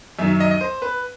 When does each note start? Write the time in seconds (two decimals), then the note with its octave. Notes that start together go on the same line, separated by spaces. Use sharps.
0.19 F#2 D#3 F#3 E5
0.40 D#5
0.51 D#5
0.61 C5
0.82 B4